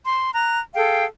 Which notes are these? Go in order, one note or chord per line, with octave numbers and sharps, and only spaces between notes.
C6
A#5 F#6
G#4 A4 F5 G5